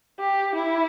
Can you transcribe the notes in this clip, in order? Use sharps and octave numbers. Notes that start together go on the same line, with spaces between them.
G4
E4